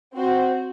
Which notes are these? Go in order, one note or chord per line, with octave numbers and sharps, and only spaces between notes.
C4 F#4 C5